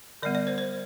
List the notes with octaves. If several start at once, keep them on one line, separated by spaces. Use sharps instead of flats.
D3 G3 B3 D5
D5
C5
C5